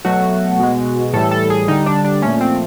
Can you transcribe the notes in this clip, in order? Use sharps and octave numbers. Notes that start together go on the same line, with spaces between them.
B2 F#3 A3 F#4
B2 G#3
A2 E3 G3 A4
A4
G#4
D3 G3 D#4
D4
D4
A#2 F3 A3 C#4
C4